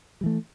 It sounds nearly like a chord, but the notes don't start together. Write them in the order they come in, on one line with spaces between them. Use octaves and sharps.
G3 E3 A3